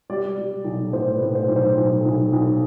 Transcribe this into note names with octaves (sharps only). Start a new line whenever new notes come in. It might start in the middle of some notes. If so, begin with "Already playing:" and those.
G3 D5
G3
B1
A2 C5
B4
A2
C5
B1
C5
B1
B1
B1